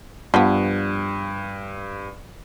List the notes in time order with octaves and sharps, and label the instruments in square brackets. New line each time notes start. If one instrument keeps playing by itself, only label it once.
[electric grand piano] G2 [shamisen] F3 B3